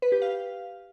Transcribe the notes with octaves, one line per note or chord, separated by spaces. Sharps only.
B4
G4
F5